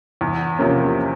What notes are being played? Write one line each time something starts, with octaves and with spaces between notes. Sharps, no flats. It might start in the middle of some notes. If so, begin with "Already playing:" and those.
E2
C3 F3 A#3 C#4